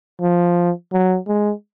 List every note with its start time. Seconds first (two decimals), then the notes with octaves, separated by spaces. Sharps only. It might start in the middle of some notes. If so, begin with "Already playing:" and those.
0.21 F3
0.93 F#3
1.27 G#3